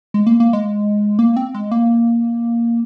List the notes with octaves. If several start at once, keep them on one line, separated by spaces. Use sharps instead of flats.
G#3
A#3
A#3
G#3
A#3
C4
G#3
A#3